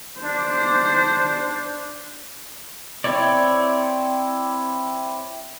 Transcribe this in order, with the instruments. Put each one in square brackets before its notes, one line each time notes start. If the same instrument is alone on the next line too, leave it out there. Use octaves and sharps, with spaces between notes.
[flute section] D4 [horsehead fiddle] C5
[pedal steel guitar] C4 E4 C#5 D5